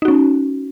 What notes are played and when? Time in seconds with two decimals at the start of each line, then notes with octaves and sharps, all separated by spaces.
0.02 D#4
0.05 F#4
0.08 C#4